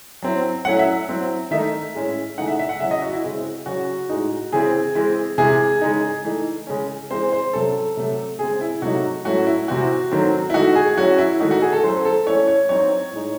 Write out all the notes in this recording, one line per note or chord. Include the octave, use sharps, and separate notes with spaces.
F#3 C4 E4
F#3 A3 C#4 E4 F#5
E5
F#3 C4 E4
D#3 A3 D#4 E5
A2 G#3 C#4 E4
C#3 E3 A3 D#4 F#5
E5
E5
F#5
C#3 F#3 C#4 E4 E5
D#5
F#4
E4
C#3 G#3 C4 E4
C#3 F#3 C#4 F#4
A2 G#3 D#4
C#3 E3 C4 E4 G#4
E3 G#3 C4 E4
C3 E3 G#3 G#4
C#3 G#3 D#4
E3 A3 D#4
C#3 G#3 C#4
E3 G#3 C4 C5
C5
C3 F#3 C#4 A4
C3 F#3 A3
C#3 G#3 C4 G#4
E4
C3 F#3 A3 D#4 F#4
A2 F#3 A3 C#4 E4 F#4
E4
C3 E3 C4 E4 F#4
D#3 F#3 A3 C4
E4
D#3 A3 D#4 F#4
G#4
F#3 C#4 E4 F#4
E4
D#3 A3 D#4 F#4
F#4
G#4
A4
F#3 C#4 E4 C5
A4
E3 A3 C#4 E4 C#5
C#5
F#3 C4 D#4 C#5
A2 G#3 D#4